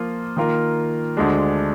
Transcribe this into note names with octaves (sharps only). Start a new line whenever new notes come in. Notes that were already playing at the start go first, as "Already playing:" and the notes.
Already playing: F3 A#3 F4
D#3 A#3 F4 A#4
D2 D3 G#3 D4